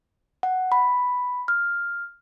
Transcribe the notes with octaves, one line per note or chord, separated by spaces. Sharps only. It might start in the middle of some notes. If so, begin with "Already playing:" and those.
F#5
B5
F6